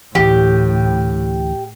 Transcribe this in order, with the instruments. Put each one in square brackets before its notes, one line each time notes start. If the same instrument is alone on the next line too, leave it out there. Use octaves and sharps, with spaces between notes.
[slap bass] D2 E3 [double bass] A2 [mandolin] G4